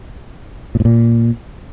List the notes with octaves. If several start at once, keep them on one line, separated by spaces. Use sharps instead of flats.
A#2
A2
A#2